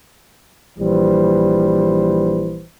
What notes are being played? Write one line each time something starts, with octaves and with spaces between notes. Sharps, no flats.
A#1 E3 G3 B4 C5